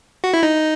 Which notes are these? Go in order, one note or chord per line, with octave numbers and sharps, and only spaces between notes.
F#4
E4
D#4